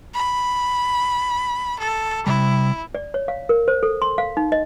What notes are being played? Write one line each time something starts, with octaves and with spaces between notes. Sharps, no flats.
B5
A4
C3 G3 E4
D5
C#5
F5
A#4
C5
A4
C6
F5
D#4
D#5